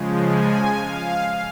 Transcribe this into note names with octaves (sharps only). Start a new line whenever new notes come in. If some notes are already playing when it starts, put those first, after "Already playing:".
Already playing: C#3 F3 G#3
G#5
F5